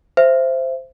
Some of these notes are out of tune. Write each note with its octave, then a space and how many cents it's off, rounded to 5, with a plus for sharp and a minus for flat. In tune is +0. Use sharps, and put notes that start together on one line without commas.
C5 +0 E5 +25